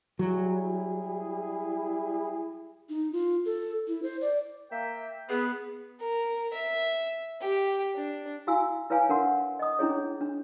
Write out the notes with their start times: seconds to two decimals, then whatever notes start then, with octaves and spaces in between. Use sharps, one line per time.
0.19 F#3 G3 E4 G#4
2.89 D#4
3.13 F4
3.45 A4
3.87 E4
4.03 C5
4.21 D5
4.71 A#3 E5 G5
5.29 B3 G#4
6.00 A#4
6.53 E5
7.41 G4
7.95 D4
8.47 E4 F#4 F5 G#5 E6
8.90 E4 B4 C#5 F5 G#5
9.09 D4 A#4 F#5 C6
9.59 D#5 D#6
9.79 C#4 D4 E4 G#4 C#5
10.21 D4